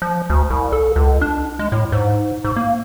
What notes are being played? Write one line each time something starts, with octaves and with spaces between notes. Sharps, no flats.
F3
D2
C2
A4
C#2
D4
G#3
A2
G#2
G#2
A#3